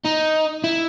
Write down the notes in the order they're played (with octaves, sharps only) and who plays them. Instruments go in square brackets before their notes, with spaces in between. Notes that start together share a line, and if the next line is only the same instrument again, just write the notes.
[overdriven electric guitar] D#4
E4